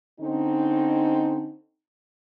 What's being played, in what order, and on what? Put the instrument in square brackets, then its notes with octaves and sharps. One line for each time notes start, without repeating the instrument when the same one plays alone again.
[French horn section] D3 C4 C#4 D#4